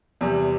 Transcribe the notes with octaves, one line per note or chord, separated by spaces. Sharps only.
E2 C3 G3